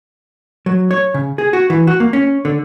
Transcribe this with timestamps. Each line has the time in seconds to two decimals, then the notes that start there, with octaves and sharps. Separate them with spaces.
0.66 F#3
0.91 C#5
1.14 C#3
1.38 G#4
1.53 F#4
1.70 E3
1.87 F#4
2.00 A#3
2.13 C#4
2.45 D3